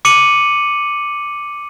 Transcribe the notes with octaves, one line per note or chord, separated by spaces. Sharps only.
D6 C#7 D#7 F#7